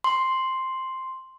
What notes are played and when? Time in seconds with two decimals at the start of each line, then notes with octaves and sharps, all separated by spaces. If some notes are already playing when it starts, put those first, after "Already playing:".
0.04 C6